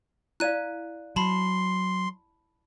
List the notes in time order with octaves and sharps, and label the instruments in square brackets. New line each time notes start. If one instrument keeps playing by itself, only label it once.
[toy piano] E4 D5 F5 [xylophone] F#6 D#7
[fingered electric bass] F#3 [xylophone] A5 B5 [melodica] C6